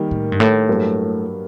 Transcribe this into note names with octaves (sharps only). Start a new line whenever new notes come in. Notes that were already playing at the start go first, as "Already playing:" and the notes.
Already playing: D#3 G3 A#3
A2
G2
A2
G2 F#3 A#3